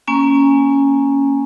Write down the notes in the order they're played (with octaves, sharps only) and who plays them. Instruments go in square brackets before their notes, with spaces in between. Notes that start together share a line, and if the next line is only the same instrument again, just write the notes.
[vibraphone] A#3 C#4 G#5